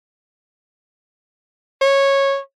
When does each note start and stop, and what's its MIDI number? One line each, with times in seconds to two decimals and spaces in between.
1.81 2.38 73